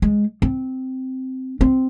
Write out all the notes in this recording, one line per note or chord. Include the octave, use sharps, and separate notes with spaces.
G#3
C4
C4